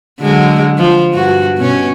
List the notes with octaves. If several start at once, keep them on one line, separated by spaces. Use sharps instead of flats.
D3 F#3 G#3
F3
G2 F#4
B2 C#4